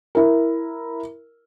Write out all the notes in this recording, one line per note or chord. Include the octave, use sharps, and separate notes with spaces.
E4 A#4